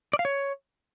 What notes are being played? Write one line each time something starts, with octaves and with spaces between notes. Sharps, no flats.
D5
F5
C#5